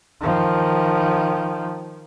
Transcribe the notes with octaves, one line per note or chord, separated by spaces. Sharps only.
D#3 F3